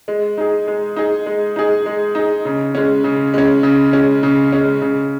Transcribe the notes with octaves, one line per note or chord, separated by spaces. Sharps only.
G#3
D#4 G#4
G#3
D#4 G#4
G#3
D#4 G#4
G#3
D#4 G#4
C#3
G#3 C#4
C#3
G#3 C#4
C#3
G#3 C#4
C#3
G#3 C#4
C#3